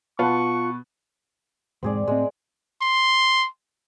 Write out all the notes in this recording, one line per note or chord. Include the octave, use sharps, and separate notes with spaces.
B2 F4 B4 F#5 A5 C#6
E1 G#2 G#3 C4 G#4 D5
A2 G#3 C4
C6